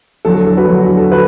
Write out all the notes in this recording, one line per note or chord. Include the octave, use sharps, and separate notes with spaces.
E2 D3 F#3 A4
A4
A4
F#4 B4
E2 D3 F#3 A4
F#4
A4
D3 F#4 B4